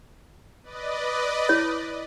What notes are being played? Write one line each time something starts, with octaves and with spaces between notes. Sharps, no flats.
B4 D5 D#5
E4 C#5